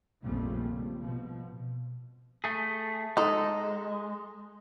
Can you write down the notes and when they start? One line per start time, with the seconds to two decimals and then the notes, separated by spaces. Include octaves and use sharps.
0.24 A#1 F2 C#3 G3 A3
0.66 G3
1.00 B2 F3
2.44 A3 G#4
3.17 G#3 D#4 A4